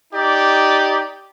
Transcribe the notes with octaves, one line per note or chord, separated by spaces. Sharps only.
D#4 G4 D5